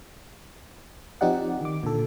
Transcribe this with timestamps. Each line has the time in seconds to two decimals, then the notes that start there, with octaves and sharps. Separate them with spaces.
1.21 F3 C4 D#4 G4 D5 F#5
1.61 D#3 D6
1.83 A#2 D3 A4